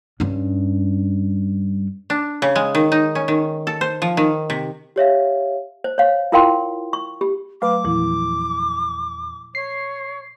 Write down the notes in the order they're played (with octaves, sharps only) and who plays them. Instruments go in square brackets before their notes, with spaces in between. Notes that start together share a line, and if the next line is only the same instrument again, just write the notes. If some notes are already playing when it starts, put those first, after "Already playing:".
[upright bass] G2 C#4
[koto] D4
C#3
G#3
D#3
D#4
C#4
D#3
A4
C5
F3
D#3
C3
[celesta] G4 C#5 E5 F5
[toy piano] C5
C#5 F5
E4 F4 A#4 F5 G5 C6
C#6
G4
[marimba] F#3 A3 [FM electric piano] B4 F5 [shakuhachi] D6
[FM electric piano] E2 [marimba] A#2 F3 E4
[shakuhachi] C#5 [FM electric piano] C7